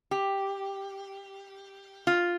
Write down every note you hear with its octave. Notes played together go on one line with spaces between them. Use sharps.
G4
F4